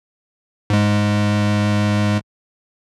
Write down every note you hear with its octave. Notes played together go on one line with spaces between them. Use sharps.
G#2 G#3